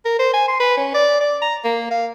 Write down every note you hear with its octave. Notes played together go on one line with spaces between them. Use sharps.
A#4
C5
G#5
C6
B4
C#4
D5
D5
A#5
A#3
F5